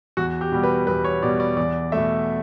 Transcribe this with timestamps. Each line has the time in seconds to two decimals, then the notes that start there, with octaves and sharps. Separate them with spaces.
0.17 E2 F#4
0.41 G4
0.52 B2 G3
0.63 B4
0.87 E2 B4
1.05 C#5
1.22 B2 G3 D5
1.40 D5
1.57 E2 D5
1.92 B2 A3 E5